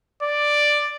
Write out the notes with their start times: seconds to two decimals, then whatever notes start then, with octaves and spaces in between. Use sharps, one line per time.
0.22 D5